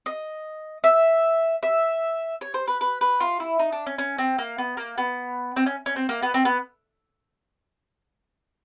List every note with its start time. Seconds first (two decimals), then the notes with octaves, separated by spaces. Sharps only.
0.06 D#5
0.84 E5
1.63 E5
2.41 C#5
2.54 C5
2.67 B4
2.81 B4
3.01 B4
3.20 F4
3.40 E4
3.59 D#4
3.72 D4
3.86 C#4
3.98 C#4
4.18 C4
4.38 A#3
4.58 B3
4.77 A#3
4.98 B3
5.56 C4
5.66 C#4
5.86 C#4
5.96 C4
6.09 A#3
6.23 B3
6.34 C4
6.45 B3